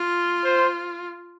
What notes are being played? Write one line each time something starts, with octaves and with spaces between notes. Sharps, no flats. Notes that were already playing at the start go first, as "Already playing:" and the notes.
Already playing: F4
C5